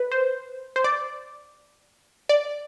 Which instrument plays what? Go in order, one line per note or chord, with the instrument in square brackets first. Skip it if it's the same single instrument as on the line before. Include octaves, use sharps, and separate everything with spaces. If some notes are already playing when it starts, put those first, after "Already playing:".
Already playing: [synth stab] B4
C5
C5
D5
D5